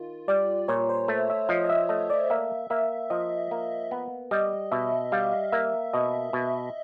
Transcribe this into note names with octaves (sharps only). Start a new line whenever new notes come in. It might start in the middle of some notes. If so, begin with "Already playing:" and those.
Already playing: D#3 F4
G3 D5
A#2 C#5
C5
A3 E5
E5
F3 D#5
D#5
E5
A3 D#5
D5
A#3 E5
A#3 E5
F3 D#5
A#3
B3
G3 D#5
B2 E5
G3 F5
A#3 E5
B2 D#5
B2